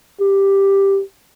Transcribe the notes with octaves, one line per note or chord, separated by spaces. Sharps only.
G4